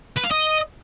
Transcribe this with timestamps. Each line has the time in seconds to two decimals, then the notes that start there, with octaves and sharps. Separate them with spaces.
0.16 B4
0.24 F5
0.31 D#5